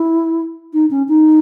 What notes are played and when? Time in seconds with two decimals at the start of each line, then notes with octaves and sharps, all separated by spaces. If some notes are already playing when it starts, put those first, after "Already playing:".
Already playing: E4
0.73 D#4
0.91 C#4
1.09 D#4